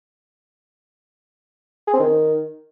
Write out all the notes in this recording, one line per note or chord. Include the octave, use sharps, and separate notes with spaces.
G#4
C4
D#3